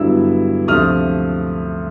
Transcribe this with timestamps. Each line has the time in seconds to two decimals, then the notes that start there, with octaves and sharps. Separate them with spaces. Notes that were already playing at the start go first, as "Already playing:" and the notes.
Already playing: G2 D3 F#3 B3 E4 E6
0.67 D2 C3 F3 A3 D#6 F6